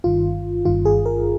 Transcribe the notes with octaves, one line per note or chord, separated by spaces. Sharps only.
G1 G2 D#3 F4
G1 G2 D#3 F4
G#4
A#4